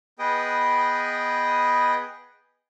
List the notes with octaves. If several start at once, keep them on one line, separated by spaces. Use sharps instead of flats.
B3 G#4 B4 D#5 G5 D#6